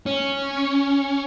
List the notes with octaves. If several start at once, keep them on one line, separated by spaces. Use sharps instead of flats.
C#4